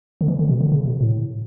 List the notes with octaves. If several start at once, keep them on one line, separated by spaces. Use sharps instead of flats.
D3
E3
D3
B2
D3
C#3
B2
A2